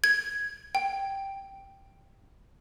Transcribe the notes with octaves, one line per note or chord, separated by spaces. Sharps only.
G#6
G5